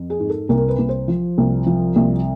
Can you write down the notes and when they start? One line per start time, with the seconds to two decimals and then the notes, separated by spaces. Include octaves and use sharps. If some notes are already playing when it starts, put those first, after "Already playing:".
Already playing: F2
0.10 G#4
0.20 G#2
0.29 A4
0.49 C2 A#4
0.68 B4
0.79 C2
0.89 C5
1.08 F3
1.38 C2
1.66 F3
1.96 C2